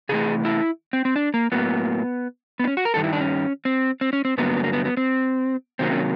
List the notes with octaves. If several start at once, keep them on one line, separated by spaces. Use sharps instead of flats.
C3 E3 A3 G#4
E4
C4
C4
D4
A#3
A2 F#3 A#3 B3
B3
D4
C#4
F#4
A#4
G2 D#3 G3 A4
E4
D4
C#4
C4
C4
C#4
C4
G2 D3 F#3 A#3 B3
A#3
B3
B3
C4
C3 D#3 F#3 A#3 C4
C#4